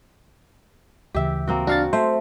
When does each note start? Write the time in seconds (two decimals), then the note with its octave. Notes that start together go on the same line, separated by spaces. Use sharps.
1.14 D2 C#3 E3 G4 E5
1.48 A#3 C4 F#4
1.67 D4 F#4 F5 A6
1.93 A3 C5